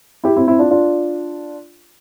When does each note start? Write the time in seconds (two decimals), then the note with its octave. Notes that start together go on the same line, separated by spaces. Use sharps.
0.24 E4 G4
0.36 C4 E4
0.47 C4 E4
0.59 D4 F4
0.71 D4 F4